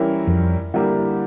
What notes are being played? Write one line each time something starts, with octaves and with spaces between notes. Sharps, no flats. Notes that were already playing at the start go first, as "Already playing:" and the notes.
Already playing: E3 G3 C#4 E4 A#4
F2
D3 G3 A#3 E4 G4